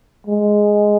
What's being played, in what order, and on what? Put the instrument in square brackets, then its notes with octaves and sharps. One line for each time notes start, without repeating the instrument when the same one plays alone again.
[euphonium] G#3